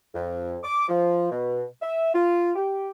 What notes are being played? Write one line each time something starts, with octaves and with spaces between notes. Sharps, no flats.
F2
D6
F3
B2
E5
F4
G4